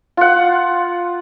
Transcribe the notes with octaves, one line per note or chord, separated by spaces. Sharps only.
F4 F#5